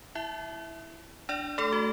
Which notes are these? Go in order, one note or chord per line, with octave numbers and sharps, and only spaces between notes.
E4 E5
D4 D5
A3 A4
F#4